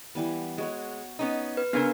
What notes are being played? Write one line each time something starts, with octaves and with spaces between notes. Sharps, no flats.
E3 G3 B3
G#3 F#4 C#5 F#5
B3 C#4 D#4
B4
C#3 B3 C#4 D4 G#4 A#4 F5 A#5